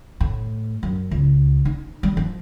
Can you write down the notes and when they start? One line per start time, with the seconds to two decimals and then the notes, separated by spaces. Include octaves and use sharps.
0.21 A2
0.83 F#2
1.11 C#2
1.65 D#4
2.03 G3
2.17 F3